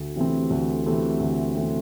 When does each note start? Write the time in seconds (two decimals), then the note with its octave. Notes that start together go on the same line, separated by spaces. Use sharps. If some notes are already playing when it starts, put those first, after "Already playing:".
Already playing: D2
0.16 C3 E3 A3 C4
0.50 D2
0.86 C3 E3 A3 C4
1.20 D2
1.55 C3 E3 A3 C4